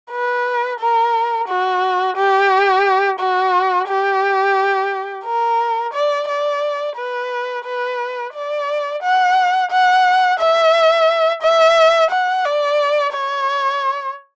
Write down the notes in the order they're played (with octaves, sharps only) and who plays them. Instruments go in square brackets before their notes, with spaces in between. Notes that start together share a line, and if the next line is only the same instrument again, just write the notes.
[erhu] B4
A#4
F#4
G4
F#4
G4
A#4
D5
D5
B4
B4
D5
F#5
F#5
E5
E5
F#5
D5
C#5